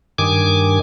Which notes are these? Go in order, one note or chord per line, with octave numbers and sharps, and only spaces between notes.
G2 D#3 G#5 D6